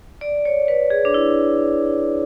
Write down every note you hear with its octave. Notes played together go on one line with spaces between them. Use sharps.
D5
C#5
B4
G#4
D4
E4